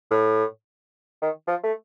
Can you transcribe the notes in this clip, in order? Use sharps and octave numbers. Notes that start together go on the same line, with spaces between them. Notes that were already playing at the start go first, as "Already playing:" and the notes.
A2
D#3
F3
A3